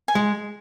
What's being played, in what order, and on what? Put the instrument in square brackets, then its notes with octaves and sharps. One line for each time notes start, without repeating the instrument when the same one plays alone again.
[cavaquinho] G#5
[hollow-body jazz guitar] G#3